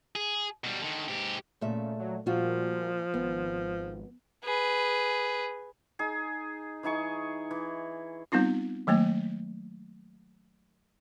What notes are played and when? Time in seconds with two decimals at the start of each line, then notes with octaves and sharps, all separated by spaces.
0.16 G#4
0.64 B2 G3
0.82 D3 D#3
1.08 G#2 G4
1.61 A#2 C#3 A3 E5
1.99 F#3
2.26 A#2 F3 G3 F4 F#4
3.14 G#1 B3
4.44 G#4 B4
5.99 D#4 G#4
6.83 E3 D#4 G#4 C#6
7.51 E3
8.32 G3 B3 C4 D#4 F4
8.87 D#3 F#3 A3 A#3